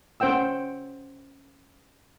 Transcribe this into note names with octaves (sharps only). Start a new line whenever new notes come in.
C#4 C5 F#5 G5 E6